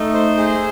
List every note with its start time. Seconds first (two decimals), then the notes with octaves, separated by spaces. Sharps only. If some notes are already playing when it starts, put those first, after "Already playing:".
Already playing: A3 D#4
0.14 C5
0.37 G#4